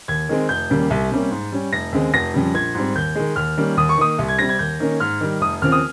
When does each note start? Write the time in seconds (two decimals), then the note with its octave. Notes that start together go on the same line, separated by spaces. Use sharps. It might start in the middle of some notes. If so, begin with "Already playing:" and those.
0.08 D#2 G#6
0.29 D#3 G#3 C4
0.49 F1 G6
0.70 D#2 C#3 G3 A#3
0.90 C2
1.11 C3 G3 A#3 C#4
1.31 G#2
1.52 G3 C#4
1.72 F1 A#6
1.92 D#2 C#3 G#3 C4
2.14 F1 A#6
2.34 F2 C#3 G3
2.54 A#1 G#6
2.75 G#2 G3 C4
2.95 D#2 G6
3.15 D#3 G#3
3.36 D#2 F6
3.57 D#3 G3 A#3 C#4
3.77 D#2 D#6
3.89 C#6
3.98 D#3 A#3 D#6
4.18 C2
4.28 G#6
4.39 C3 G3 C4 A#6
4.49 G#6
4.59 D#2 G6
4.80 D#3 A#3 C#4
5.00 G#2 F6
5.21 D#3 G3
5.41 F1 D#6
5.62 D#2 C#3 F3 C4 F6
5.72 D#6